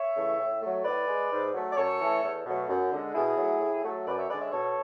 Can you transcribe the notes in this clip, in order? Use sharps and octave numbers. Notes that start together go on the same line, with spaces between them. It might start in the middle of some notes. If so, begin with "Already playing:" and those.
Already playing: C#5 E5
C#3 E3 A3
A2
F#3 A3
A2 B4 D5
G#3
G#2
F#3 A3
D5
F#2 A4 C#5
E3 A3
E2
B2 F#3 A3
F#2
D3 G#3
B2 E4 G#4
F#3 A3
A2
F#3 A3
F#2 B4 D5
C#5 E5
D3 G#3 B4 D5
C#5 E5
B2 A4 C#5